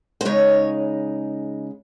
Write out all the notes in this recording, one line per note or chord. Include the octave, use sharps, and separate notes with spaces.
C5
C#3 G#3 D#4 C#5